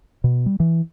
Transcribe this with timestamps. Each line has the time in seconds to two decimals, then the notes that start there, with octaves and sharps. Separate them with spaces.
0.24 B2
0.46 G3
0.60 E3